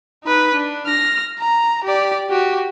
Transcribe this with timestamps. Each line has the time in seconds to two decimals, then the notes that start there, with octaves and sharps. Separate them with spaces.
0.24 D#4 B4
0.54 D4
0.86 F6 A#6
1.39 A#5
1.84 G4 D5
2.30 F#4 G4